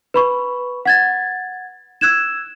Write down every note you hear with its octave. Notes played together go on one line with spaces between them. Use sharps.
B4 B5 C#6
F#5 G#6 A6
E6 F#6 G#6 E7